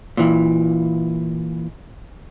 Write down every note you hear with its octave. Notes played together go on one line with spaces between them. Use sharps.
A#2 E3